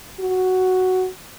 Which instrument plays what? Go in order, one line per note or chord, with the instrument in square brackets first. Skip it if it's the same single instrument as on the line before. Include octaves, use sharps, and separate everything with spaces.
[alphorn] F#4